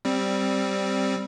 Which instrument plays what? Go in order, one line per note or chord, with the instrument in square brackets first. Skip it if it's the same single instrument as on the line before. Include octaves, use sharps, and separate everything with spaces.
[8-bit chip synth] G3 C4